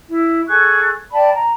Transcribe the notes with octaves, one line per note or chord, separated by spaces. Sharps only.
E4
G#4 A4 C#6 F#6
D5 G5 A5 B5
A#5